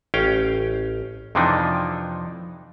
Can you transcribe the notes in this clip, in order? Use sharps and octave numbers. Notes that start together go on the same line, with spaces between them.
A1 C#4 F5 G5
F2 C3 E3 F3 D4 D#4